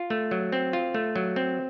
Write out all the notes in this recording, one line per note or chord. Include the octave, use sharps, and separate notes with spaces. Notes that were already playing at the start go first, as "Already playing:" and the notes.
Already playing: F4
A3
F#3
C4
F4
A3
F#3
C4